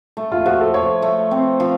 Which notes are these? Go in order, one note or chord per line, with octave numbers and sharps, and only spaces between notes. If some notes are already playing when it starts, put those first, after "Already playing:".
A3
F4
F3 F#4
A4
F3 C#5
A3
C4
F3